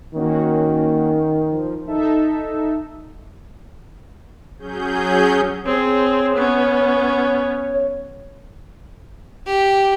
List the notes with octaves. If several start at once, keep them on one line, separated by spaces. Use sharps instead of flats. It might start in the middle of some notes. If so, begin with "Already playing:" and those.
D#3 A#3 C#4 F#4
F3
D#4 A4 E5
F#3 C#4 G#4 G6
C4 G#4 C#5
B3 C#4
G4